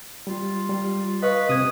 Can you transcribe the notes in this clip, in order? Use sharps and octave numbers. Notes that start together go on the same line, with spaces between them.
G3 F4
G3
B4 D#5 F5 C#6
C3 C4 D#6 G#6